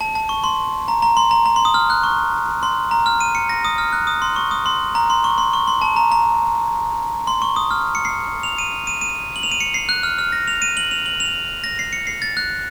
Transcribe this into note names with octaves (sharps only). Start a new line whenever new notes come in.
A5
A5
C#6
C6
A#5
A#5
C6
A#5
A#5
C6
D#6
F6
F#6
C#6
C6
A#5
F6
D#7
C#7
A#6
D#6
F6
F#6
D#6
C6
C#6
D#6
C6
A#5
C6
C#6
C6
C#6
C6
A5
A#5
A#5
C6
C#6
D#6
F6
C#7
C7
F7
D#7
D#7
D#7
F#7
F7
D#7
C#7
C7
F#6
F6
F6
A#6
F7
D#7
F#7
F7
F#7
F7
A#6
C7
C#7
C7
A6
F#6